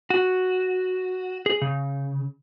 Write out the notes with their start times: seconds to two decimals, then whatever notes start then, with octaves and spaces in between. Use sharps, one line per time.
0.10 F#4
1.46 G#4
1.62 C#3